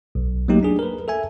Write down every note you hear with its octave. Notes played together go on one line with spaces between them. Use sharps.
B1
F#3 A3 A#3 D#4 G4
D4 G#4
A#4 B4
A4 E5 G#5